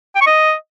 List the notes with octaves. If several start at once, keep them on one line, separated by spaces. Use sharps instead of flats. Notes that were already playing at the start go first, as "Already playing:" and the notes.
G5
C#6
D#5